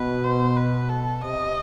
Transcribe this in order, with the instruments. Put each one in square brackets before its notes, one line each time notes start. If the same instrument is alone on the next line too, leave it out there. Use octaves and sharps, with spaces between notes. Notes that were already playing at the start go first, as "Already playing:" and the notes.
Already playing: [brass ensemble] B2 [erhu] B4
[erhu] C5
B4
A4
[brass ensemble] C3 [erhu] D#5